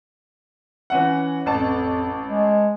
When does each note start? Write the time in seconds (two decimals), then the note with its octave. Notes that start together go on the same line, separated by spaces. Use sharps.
0.90 E3 C#4 F#5
1.46 A1 F2 A5
2.26 G#3